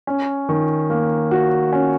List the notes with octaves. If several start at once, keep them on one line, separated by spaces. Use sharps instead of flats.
C#4
D#3
A#3
F#4
C#4